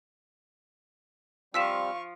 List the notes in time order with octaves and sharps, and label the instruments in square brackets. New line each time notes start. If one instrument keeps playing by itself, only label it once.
[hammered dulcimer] F3 [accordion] G3 C4 [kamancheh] F5 C#6 [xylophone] E6 B6 E7